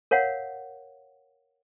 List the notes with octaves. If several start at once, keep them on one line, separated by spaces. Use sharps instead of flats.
A#4 C#5 F5 F#5